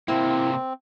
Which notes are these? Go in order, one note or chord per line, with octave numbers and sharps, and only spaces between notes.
C3 A#3 C4 E4